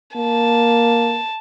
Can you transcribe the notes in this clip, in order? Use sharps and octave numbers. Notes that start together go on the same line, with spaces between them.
A#3 A5